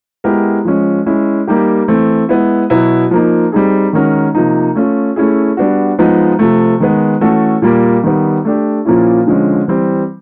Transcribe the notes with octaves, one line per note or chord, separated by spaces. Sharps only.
G#3 B3 E4 G4 A#4
F3 G#3 C#4
G#3 C#4 E4
G3 A#3 D#4 G4
E3 A3 C4
G#3 B3 E4
B2 F#3 B3 E4
F3 A#3 D#4
G3 C4 D#4 G#4
D#3 G#3 C#4 F#4 A#4
C3 F3 A#3 D#4
A3 C#4 F4
A3 C#4 E4 G#4
G3 B3 D4 F#4
F3 G#3 B3 D#4
C3 F3 A3
D#3 G#3 B3
E3 A3 C#4 F#4 A4
A#2 G3 A#3
D#3 G3 B3
A3 D4 G4
A#2 F3 A#3 C#4 E4
D3 F3 G#3 C#4
E3 G3 C4